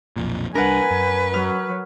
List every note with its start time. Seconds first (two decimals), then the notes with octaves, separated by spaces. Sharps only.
0.16 B1 F2 A#2
0.55 C2 G3 D4 A#4 B4 F#5 G#5
0.91 F#2
1.34 F#3 F6